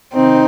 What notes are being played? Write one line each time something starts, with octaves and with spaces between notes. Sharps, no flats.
C3 D#3 C4 D#4